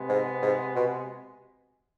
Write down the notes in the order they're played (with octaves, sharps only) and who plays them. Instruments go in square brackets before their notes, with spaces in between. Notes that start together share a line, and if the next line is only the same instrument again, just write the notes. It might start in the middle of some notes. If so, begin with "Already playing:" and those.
Already playing: [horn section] C3 G#3 B3
[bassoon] G#2
G#2
B2